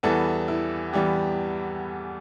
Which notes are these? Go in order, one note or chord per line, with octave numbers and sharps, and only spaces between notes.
E2 E3 G3 B3 A4
E4
E3 G3 B3 G4